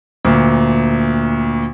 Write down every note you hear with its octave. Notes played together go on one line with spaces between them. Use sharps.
D2 A#2